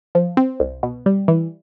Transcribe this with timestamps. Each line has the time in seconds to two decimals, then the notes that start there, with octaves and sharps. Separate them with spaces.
0.15 F3
0.37 C4
0.60 C2
0.83 B2
1.06 G3
1.28 E3